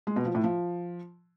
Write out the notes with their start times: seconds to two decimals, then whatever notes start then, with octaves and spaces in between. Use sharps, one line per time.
0.07 G#3
0.16 B2
0.25 F3
0.35 A2
0.44 F3